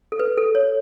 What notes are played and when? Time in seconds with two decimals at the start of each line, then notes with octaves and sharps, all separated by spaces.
0.12 A4
0.19 B4
0.38 A4
0.55 C#5